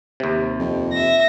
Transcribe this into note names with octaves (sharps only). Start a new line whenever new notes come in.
D#2 C3
F2
E5 A#6